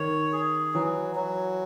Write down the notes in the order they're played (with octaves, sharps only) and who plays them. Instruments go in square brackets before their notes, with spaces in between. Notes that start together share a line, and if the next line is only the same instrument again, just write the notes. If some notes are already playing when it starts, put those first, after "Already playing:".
Already playing: [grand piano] D#3 [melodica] C#5
[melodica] G#4
[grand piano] E3 [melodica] F#3
[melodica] F#3